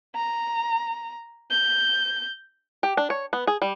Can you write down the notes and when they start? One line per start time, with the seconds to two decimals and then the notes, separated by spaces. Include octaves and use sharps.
0.15 A#5
1.50 G6
2.83 G4
2.97 D4
3.10 C#5
3.33 B3
3.47 G#4
3.62 G3